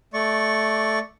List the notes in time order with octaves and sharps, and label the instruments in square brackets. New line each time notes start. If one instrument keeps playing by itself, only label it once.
[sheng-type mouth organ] A3 D5 C#6